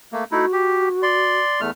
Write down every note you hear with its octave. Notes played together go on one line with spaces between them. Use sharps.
A3 A#3
A3 D#4 E4 F#4
G4
D5 C6
E2 A3 F6